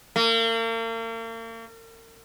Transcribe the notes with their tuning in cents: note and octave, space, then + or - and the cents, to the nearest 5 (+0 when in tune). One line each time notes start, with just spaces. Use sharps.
A#3 -40